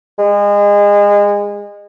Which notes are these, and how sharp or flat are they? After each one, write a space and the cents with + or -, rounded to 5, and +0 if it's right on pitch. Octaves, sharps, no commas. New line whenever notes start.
G#3 -30